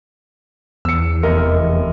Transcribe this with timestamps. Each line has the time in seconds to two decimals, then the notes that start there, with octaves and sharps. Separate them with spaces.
0.85 E2 E6 C#7
1.23 F1 A#4 D#5